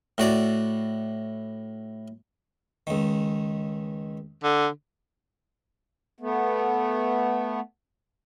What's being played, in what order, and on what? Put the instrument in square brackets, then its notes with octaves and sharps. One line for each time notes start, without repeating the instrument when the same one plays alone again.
[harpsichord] A2 F#4 D5
C#2 D#3
[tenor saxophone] D3
[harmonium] A3 B3